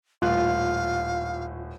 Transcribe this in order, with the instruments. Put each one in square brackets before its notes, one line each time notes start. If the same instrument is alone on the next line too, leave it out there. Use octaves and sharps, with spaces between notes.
[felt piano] D#1 A2 F#6 [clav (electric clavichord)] F4 [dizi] F5